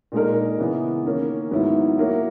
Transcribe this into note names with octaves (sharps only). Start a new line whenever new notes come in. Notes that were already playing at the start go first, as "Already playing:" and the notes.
A#2 G#3 D#4 A#4
C#3 E3 B3
D#3 A#3 C#4
G#2 D#3 F#3 B3 E4
F#3 A#3 E4